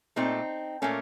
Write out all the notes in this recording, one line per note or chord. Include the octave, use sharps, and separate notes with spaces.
A#2 A3 C4 D#4
A#2 A3 A#3 C#4